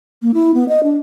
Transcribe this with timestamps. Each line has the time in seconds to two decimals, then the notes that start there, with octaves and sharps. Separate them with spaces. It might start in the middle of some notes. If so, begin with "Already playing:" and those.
0.22 A#3
0.34 E4
0.54 B3
0.69 D#5
0.83 D4